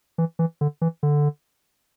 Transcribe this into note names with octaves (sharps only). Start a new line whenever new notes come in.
E3
E3
D3
E3
D3